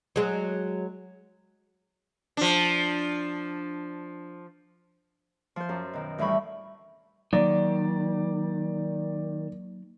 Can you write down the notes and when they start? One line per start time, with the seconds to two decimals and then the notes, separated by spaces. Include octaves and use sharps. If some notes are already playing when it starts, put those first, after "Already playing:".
0.16 F#3 G#3
2.37 F3 D4
5.56 F3 C5
5.69 F#2
5.93 B2 D#3
6.18 D2 A2 E3 G3 B5 C#6
7.33 D#3 F#3 A#3 D5